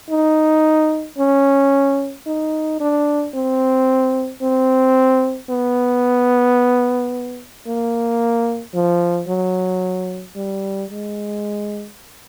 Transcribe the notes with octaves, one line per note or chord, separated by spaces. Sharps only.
D#4
C#4
D#4
D4
C4
C4
B3
A#3
F3
F#3
G3
G#3